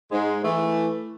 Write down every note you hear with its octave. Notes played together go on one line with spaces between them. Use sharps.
G#2 G#3
E3 A3